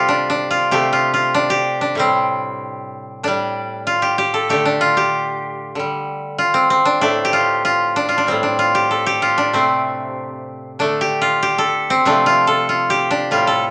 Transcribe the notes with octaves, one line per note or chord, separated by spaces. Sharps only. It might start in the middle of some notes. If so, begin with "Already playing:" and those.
Already playing: C3 G3 F4 G4 A4
D4
D4
F4
C3 A3 G4
F4
F4
D4
G4
D4
A2 G3 C4
A2 G3 D4
F4
G4
G4
A4
D3 A3 G4
D4
F4
G4
D3 G3
F4
C4
C4
D4
A2 A3 D4
G4
F4
F4
D4
F4
D4
A2 G3 C4
D4
F4
G4
A4
G4
F4
D4
C3 A3 C4
D3 A3 D4
G4
F4
G4
A4
C4
C3 F3 A3 D4
F4
A4
F4
G4
D4
A2 G3 F4
A4